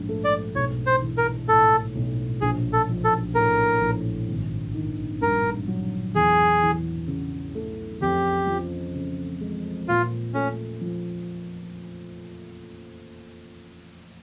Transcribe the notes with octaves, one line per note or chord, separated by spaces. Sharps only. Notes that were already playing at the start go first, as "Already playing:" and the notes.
Already playing: A#1 G#2 F3
A3
D5
B1 C#5
C5
E3
A#4
A2 A4
B1
A#1 G#4
A4
F3
A4
A2 A#4
A#1
G#1
D#3
G2 A#4
F#3
E2 G#4
E3
C#3
A3
F2 G4
F3
C#3
G#3
A#2 F4
A3 C#4
F3